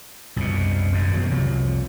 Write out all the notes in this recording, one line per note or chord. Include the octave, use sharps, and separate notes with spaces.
C2 F#2 B2
G#1 G2 B2
B2 E3 F#3
C2 F2 C3 F#3